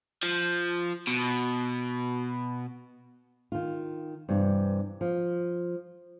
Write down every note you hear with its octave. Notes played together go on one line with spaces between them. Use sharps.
F3
B2
D#3 F4
G2 C3 E3
F3